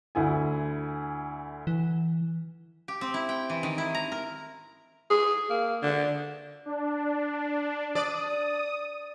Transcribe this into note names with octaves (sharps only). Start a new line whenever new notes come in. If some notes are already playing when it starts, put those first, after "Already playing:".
D2 E4 G#5
E3
G4
C4
E4
G5
E3
D#3
E4
A#5
A#4
G#4
A#3
D3
D4
D5 D#6